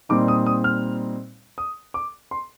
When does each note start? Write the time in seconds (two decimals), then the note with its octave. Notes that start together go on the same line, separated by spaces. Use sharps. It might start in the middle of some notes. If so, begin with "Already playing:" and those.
0.09 A#2 G3 C4 D#4 D6
0.28 D#6
0.46 D#6
0.64 F6
1.58 D#6
1.94 D6
2.31 C6